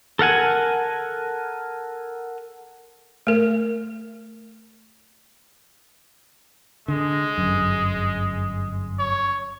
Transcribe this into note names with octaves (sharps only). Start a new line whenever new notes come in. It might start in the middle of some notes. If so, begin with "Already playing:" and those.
A4 A#4 F#5 G#5
A3 A#4
D3 G#3
G1 F#2
C#5